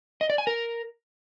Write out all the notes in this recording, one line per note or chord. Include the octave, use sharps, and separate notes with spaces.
D#5
D5
G#5
A#4